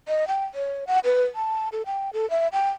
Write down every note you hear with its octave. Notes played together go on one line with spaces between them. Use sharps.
D#5
G5
C#5
F#5
B4
A5
A4
G5
A4
E5
G5